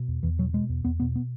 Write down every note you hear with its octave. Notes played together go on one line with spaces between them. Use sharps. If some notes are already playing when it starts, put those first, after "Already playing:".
Already playing: B2
E2
E2 E3
B2 F#3
B2 G#3
E2
E2 B3
B2 B3
B3